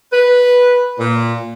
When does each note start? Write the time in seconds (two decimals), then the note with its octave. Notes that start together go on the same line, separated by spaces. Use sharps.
0.12 B4
0.99 A#2